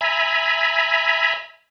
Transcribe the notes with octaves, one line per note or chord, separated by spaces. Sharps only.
E5 G#5 A#5 B5